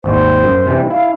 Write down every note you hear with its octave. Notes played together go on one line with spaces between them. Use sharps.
G#1 D#2 G3 C5
F#2
C3 E3 G3
E4 F5